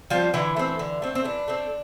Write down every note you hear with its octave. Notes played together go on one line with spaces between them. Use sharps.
F3 G3 C4 F4
D3 E3 E4
A3 C4
D3
A3 C4
C4
E3 D4
A3 C4